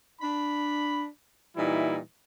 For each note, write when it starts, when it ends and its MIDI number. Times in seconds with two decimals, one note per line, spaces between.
0.22 1.07 62
0.22 1.07 83
1.57 1.98 46
1.57 1.98 52
1.57 1.98 55
1.57 1.98 63
1.57 1.98 64